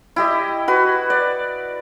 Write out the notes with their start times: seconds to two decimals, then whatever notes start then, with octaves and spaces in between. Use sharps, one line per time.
0.16 E4 G4 D#5
0.68 F#4 B4
1.10 D5